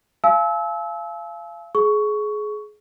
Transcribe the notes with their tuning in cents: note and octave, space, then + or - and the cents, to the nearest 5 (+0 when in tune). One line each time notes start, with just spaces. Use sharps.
F5 -30 G#5 +45 E6 -25
G#4 +25 C#6 +10